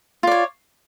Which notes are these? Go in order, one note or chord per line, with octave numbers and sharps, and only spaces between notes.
F4 C#5 D5